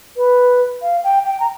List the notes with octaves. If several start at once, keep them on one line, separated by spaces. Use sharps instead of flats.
B4
F5
G5
G5
A#5